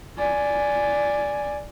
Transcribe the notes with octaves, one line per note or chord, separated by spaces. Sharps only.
D5 G#5